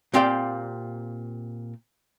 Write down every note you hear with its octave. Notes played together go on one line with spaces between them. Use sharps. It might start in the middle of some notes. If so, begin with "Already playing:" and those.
A#2 C4 G4 D5 F5 G5